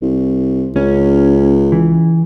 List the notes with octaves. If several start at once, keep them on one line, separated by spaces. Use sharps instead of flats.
C2
C#2 C#4
E3